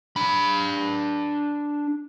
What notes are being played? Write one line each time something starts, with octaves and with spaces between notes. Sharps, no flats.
D4 B5